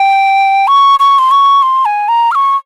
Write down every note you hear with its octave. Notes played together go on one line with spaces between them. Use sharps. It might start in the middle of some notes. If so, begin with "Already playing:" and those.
Already playing: G5
C#6
C#6
C6
C#6
C6
G#5
A#5
F6
C#6